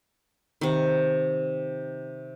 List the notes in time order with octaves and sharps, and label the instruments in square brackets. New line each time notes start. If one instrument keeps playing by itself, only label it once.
[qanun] C3 D#3